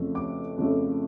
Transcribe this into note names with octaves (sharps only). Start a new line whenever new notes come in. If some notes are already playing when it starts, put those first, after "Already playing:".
Already playing: F2 C#3 F3 A3
D6
F2 C#3 F3 A3